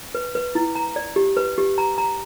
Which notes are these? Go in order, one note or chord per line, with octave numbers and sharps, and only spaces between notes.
B4
B4
E4
A#5
D5
G4
B4
G4
A#5
A#5